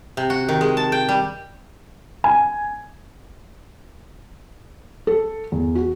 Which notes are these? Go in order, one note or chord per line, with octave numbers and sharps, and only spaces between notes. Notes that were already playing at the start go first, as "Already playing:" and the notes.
C3
F#4
D#3
G#3
A5
G5
G3
G#5
A4
E2
F#4